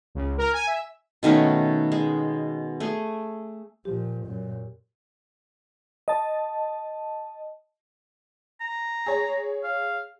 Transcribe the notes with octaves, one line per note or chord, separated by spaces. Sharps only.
C#2
A#4
G#5
E5
B2 D#3 A3 C#4
G#3
A3 G#4
A#2 F3 G4
F#2 A#2
D#5 A5
A#5
G#4 C#5
F5